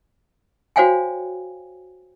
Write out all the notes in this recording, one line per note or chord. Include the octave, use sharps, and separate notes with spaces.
F#4 C5 C#5 F5 G5 G#5